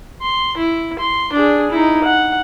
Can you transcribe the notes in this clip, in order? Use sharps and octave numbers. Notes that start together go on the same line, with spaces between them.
C6
E4
C6
D4 G#4
D#4 E4
F#5